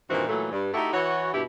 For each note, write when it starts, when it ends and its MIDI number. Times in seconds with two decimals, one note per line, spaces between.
0.10 0.26 43
0.10 0.26 46
0.10 0.26 51
0.10 0.26 52
0.10 0.26 60
0.10 0.26 66
0.28 0.49 46
0.28 0.49 52
0.28 0.49 54
0.28 0.49 57
0.52 0.70 43
0.74 0.90 57
0.74 0.90 63
0.74 0.90 64
0.74 0.90 66
0.74 0.90 67
0.74 0.90 69
0.93 1.31 52
0.93 1.31 66
0.93 1.31 73
1.34 1.43 43
1.34 1.43 47
1.34 1.43 64
1.34 1.43 67